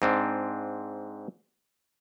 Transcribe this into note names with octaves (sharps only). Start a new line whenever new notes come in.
G#2 C4 D4